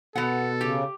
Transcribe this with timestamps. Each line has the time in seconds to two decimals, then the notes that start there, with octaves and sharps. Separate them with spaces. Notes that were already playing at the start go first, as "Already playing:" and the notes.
0.16 B2 B3 A4 F#5
0.61 C#3 G4